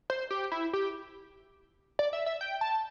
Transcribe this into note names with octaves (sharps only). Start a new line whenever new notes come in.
C5
G4
E4
G4
D5
E5
E5
G5
A5